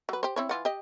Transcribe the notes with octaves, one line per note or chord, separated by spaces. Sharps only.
F#3 B4
G4 C5
C4 E4 C#5
E3 F4 F#5
G4 D#5